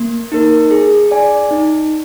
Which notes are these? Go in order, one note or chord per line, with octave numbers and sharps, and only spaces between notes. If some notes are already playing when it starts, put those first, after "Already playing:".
Already playing: A#3
D#4 A#4
G#4
D5 G#5
D#4